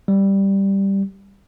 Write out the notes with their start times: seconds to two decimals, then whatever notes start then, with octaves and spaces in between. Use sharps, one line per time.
0.08 G3